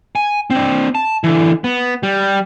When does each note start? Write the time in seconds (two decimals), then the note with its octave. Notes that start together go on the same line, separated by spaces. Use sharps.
0.16 G#5
0.50 C4 D4
0.95 A5
1.24 D3 E3
1.64 B3
2.03 G3